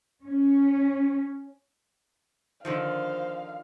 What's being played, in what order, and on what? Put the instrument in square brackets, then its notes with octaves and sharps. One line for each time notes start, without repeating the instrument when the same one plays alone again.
[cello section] C#4
[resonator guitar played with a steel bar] D3 D#3 F3 [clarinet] C5 [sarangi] F5